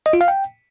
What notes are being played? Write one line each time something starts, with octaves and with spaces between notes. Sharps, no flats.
D#5
F4
F5
G5